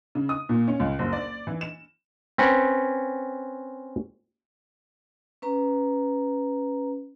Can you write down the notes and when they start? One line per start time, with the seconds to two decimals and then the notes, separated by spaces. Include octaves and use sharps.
0.15 C#3
0.29 D#6
0.49 A#2
0.68 C#4
0.80 C#2
0.99 F#1
1.13 D5
1.47 E3
1.61 E7
2.38 C4 C#4 B4 F#5
5.42 C#4 B4 A#5